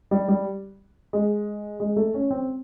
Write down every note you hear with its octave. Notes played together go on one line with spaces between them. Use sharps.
G3
G3
G#3
G#3
A3
C#4
C4